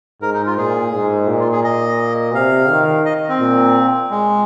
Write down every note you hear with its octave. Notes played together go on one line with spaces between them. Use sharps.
G#2 A#4
D#4
F4
A#2 G#4
G#2
A#2
F4
G#4
D#5
C3 F5
D#3
D#5
C4
A#2
G#3